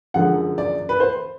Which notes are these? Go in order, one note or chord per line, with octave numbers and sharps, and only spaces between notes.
F#2 D3 F3 G#3 F#5
D5
B4
C5